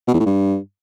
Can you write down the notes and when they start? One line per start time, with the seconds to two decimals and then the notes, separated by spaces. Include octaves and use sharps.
0.08 B2
0.14 E2
0.20 A2
0.26 G2